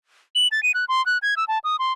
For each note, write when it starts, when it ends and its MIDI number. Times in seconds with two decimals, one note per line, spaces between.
0.35 0.48 102
0.52 0.63 93
0.63 0.72 99
0.74 0.85 90
0.89 1.04 84
1.06 1.18 90
1.22 1.35 92
1.37 1.45 88
1.48 1.59 81
1.64 1.76 87
1.79 1.93 84